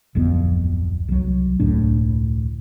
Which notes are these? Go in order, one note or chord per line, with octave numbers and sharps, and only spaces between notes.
D1 G1 F2 B3
C2 F#3
E1 C#2 A2 D4